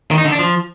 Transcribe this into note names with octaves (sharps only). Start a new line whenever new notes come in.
D#3
D#4
D3
D4
F3